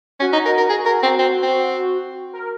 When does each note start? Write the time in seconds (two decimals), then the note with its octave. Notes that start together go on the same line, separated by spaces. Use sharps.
0.20 C#4 F#4
0.33 D#4
0.46 A#4
0.58 A#4
0.70 G#4
0.86 A#4
1.03 C4
1.19 C4
1.43 C4
2.33 A#4